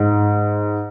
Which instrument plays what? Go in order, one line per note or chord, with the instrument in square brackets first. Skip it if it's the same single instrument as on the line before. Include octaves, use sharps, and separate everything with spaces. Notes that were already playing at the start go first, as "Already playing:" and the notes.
Already playing: [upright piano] G#2